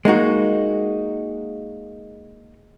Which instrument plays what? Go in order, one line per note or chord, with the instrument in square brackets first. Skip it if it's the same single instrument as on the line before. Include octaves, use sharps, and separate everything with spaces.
[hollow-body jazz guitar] G#3 A#3 D#4 F#4